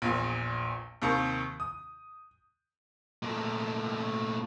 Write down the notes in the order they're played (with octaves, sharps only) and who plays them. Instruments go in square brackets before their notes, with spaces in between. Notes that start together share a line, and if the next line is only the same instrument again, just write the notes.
[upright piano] A#1 E2 A#2
D#2 C3 D#3
D#6
[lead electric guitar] A#2 A3